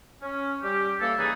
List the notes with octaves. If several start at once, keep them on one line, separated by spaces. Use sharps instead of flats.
C#4
G3 G4
E3 A#3 A4
C#3 E3 D#4 G#4 B4